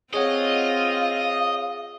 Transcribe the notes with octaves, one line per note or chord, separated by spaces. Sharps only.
C4 F4 G#4 C#5 D#5 F5 F#5